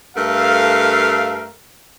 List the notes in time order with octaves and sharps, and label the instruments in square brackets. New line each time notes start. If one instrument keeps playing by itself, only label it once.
[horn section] G2 A3 A4 A#4 F5